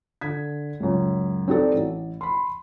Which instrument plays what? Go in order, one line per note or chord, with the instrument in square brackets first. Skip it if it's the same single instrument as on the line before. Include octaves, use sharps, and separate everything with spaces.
[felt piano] D3 G#6 B6
C#2 F#2
C4 D#4 F#4 G4 A4 D5
A1
B5 C6